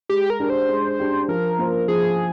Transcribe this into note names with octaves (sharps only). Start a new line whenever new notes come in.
G#3 G4
A#4
D4 G4
C5
G#3
D4 G4
F3 A#4
A#3 F4 C5
F3 G#4